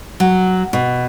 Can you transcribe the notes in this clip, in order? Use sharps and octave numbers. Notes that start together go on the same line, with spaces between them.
F#3
B2